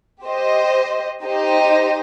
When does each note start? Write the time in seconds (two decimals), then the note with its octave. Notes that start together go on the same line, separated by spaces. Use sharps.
0.23 G4 C5 D#5
1.24 D#4 G4 C5 D#5